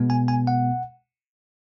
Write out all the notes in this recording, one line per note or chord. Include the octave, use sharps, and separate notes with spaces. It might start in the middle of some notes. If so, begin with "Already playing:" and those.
Already playing: B2 G#3 B3
G#5
G#5
F#5